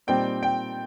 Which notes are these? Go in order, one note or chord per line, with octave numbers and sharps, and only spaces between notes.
A#2 G3 C4 D#4 G5
G5